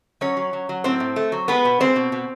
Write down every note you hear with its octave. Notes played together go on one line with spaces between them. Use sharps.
F#3 C#4 C#5
F#3
F#3
F#3
A2 C4 C5
A2
A3
F#3
G#3 B3 B4
B2
G#3 C4 C5
B2
B2